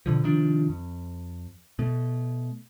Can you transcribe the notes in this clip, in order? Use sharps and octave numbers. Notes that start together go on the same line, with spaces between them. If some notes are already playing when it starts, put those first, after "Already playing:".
B2 D3 F3
C3 D#3 F3 D4
F2
B2 A3